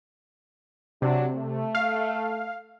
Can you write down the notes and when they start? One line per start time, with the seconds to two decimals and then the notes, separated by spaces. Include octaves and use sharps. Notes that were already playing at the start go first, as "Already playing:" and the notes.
1.02 C3 F#3 D4
1.35 A3
1.75 F5